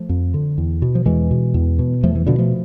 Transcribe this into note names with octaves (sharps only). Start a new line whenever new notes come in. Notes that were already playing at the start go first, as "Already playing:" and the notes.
Already playing: F3 A3
F2
D3
E2
B2
F3
E2 E3 G#3
B2
E2
B2
E2 F3 A3
E3
B2 D3 F3
F3 A3